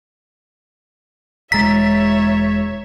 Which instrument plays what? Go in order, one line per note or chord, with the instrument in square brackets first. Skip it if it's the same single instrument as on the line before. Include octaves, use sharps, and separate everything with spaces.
[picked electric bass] E1 G#3 [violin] C#5 E5 [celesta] A#5 E6 A6 [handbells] B6